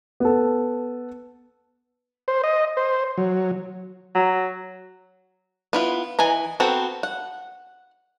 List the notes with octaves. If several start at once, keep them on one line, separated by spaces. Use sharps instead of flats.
B3 A4
C5
D#5
C5
F#3
F#3
B3 E4 F4
E3 D#5 G#5 A#5
B3 C4 F#4 A4 A#4
F#5